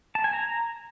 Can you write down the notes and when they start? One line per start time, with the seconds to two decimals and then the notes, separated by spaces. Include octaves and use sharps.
0.15 A5
0.24 G#5
0.33 A#5